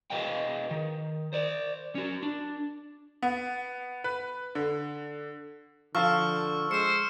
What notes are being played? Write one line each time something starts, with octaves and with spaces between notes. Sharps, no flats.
F#4 G#4 B4 D#5 F5 G5
D#3
C5 D5
C#4 F#4
D4
B3
B4
D3
D3 F3 F5 A5 C#6 E6 F6
G#3 C5 E6 C#7